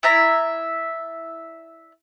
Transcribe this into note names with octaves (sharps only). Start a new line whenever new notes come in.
E4 D5 E5 A#5